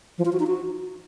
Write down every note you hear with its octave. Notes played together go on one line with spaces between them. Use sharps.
F3
F4
F#4
D#4
F#4